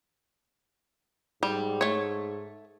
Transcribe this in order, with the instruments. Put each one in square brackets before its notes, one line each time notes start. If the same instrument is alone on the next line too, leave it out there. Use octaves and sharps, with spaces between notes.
[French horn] G#2 [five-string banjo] G3
[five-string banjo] A3 C#5